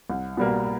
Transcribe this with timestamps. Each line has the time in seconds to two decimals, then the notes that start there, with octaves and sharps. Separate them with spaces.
0.10 C2
0.37 B2 G3 A#3